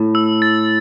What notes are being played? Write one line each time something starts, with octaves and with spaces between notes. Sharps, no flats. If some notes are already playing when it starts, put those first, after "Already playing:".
Already playing: A2
E6
A6